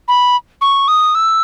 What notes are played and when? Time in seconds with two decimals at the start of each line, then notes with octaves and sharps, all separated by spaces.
0.08 B5
0.61 C#6
0.88 D#6
1.15 E6